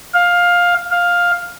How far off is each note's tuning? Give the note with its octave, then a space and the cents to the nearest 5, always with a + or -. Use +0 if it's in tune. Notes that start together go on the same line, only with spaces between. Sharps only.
F5 +15
F5 +10